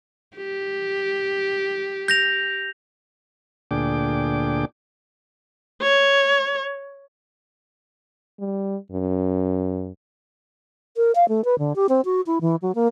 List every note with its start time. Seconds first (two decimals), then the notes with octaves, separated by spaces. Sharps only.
0.37 G4
2.08 G6 A#6 F7
3.71 D2 A#2 D4 G#4 G5 D6
5.82 C#5
8.39 G3
8.92 F#2
10.97 A#4
11.15 F5
11.29 A3
11.45 B4
11.59 D3
11.76 G4
11.89 C4
12.05 F#4
12.26 E4
12.41 E3
12.62 F#3
12.75 A#3